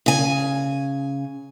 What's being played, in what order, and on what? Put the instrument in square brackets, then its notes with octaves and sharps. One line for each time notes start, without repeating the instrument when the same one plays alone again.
[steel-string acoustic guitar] C#3 G#5